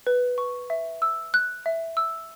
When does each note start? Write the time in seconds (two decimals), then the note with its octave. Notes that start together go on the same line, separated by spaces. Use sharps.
0.07 B4
0.38 C#6
0.70 E5
1.02 E6
1.34 F#6
1.66 E5
1.97 E6